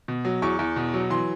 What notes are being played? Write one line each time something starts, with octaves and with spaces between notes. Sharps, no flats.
B2
F#3
E2 C#6
E2
B2
F#3
E3 C6